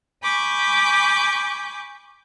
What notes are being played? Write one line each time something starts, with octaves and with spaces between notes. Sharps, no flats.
G#5 B5 C#6 D6 G6